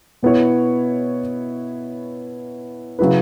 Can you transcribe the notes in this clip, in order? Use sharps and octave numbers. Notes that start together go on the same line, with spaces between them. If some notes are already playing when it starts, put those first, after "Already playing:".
B2 B3 E4 C#5
C#3 F#3 E4 B4